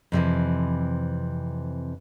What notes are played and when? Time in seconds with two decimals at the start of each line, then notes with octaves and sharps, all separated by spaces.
0.12 F2 C3 D#3 E3